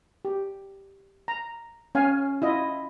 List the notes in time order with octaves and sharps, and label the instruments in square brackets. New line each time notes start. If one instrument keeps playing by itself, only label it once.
[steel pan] G4
A#5
C#4 F5 G#5
E4 F4 D#5